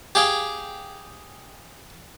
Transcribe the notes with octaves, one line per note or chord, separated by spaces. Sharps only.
G4 G#4 F5 G5